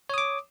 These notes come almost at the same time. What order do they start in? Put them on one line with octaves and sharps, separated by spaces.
C#5 D#6 D6